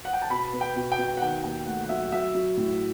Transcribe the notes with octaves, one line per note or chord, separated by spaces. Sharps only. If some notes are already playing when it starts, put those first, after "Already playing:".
F#5
G5
A5
B2 B5
B3
G5
B2
G5
B2
F#5
D#3 G5
D#2 G5
A3 F#5
F#5
F#3 E5
F#5
F#3 E5
F#3
A2